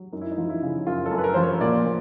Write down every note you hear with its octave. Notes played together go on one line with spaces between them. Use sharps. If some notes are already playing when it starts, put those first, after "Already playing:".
Already playing: F#3
F#2 D#4
E4
D#4
F3
E4
C#3
F#2 F4
A4
F#2
B4
A#4
F3 C5
C#5
A#2 D5
A#2